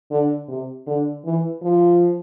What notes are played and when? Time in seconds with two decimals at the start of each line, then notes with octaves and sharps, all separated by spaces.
0.11 D3
0.48 C3
0.87 D3
1.25 E3
1.62 F3